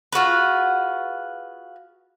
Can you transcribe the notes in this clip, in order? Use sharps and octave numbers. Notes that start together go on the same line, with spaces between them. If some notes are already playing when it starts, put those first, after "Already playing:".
F4 F#4 G#4 B4